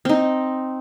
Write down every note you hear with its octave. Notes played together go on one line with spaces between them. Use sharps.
C4 D#4